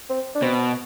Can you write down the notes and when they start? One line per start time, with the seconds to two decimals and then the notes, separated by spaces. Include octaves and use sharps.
0.10 C4
0.35 D4
0.42 B2 C4